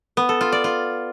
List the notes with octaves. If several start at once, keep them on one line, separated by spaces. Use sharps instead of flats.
B3
A4
F4
D5
F4